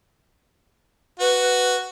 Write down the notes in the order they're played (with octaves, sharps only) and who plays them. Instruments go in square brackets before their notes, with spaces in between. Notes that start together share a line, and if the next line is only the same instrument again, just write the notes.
[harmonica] F#4 [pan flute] B4